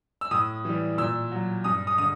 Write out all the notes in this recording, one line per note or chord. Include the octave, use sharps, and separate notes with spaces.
E6
A2 D#6
E3 G3
A#2 E6
F#3
G2 D#6
D#6
D3 D#6